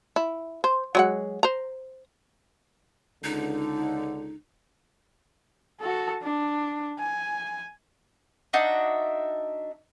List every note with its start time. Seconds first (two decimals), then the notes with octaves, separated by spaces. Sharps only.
0.16 E4
0.64 C5
0.95 F#3 G#3 F#5
1.43 C5 A#5
3.24 C#2 D3 D#4
5.80 F#4 A4
6.22 D4
6.99 G#5
8.53 D4 D#4 F#4 E5